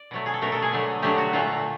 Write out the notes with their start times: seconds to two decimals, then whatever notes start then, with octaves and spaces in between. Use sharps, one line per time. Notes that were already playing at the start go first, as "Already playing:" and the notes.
Already playing: D5
0.11 B2 F#3 A3
0.26 G#4
0.34 A4
0.42 B2 F#3 A3 A#4
0.52 A4
0.62 G#4
0.72 D3 F#3 A3
1.02 D3 F#3 A3 G4
1.18 F#4
1.33 A#2 F#3 A3 F4